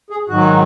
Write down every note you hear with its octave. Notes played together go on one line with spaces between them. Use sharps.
G#4
G#2 D#3 F#3 F#4